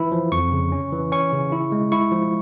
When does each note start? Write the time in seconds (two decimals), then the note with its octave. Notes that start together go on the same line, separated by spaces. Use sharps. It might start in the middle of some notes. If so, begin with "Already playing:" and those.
Already playing: E3 E4
0.12 F3
0.32 F2 C#6
0.52 C#3
0.72 C#4
0.92 E3
1.12 C#4 C#6
1.33 C#3
1.52 E4
1.72 G#3
1.92 E4 C#6
2.12 F3